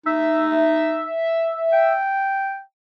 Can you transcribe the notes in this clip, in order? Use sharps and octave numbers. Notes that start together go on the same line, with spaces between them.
D#4 E5
G5